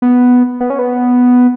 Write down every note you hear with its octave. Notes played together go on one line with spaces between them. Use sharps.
B3
B3
C#4
B3